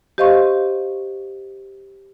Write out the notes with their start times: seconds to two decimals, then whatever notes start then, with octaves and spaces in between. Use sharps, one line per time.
0.18 G4 C5 D#5 F5 C6 C#6